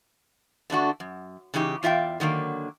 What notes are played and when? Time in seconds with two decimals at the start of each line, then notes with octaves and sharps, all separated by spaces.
0.70 D3 A3 D4 F#4
1.00 F#2
1.54 C#3 E3 D#4 G4
1.83 E2 F4 E5 F5 G5
2.20 D3 D#3 F#3 A#3